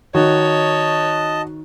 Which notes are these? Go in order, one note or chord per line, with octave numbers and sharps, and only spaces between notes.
D#3 F#4 C#5 D#5 A5